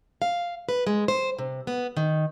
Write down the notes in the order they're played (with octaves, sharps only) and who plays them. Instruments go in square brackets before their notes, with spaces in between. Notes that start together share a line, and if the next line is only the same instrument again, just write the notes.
[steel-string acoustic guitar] F5
B4
G#3
C5
C3
B3
D#3